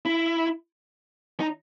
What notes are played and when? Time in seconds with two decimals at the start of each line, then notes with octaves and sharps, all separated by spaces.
0.05 E4
1.40 D#4